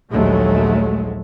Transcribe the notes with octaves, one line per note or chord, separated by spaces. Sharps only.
A#1 D#2 F#3 G#3 A3